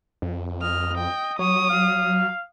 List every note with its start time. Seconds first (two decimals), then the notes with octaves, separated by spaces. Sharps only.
0.22 F2
0.62 D#5 F6
0.98 G5
1.39 F#3 C#5 D#6
1.70 F5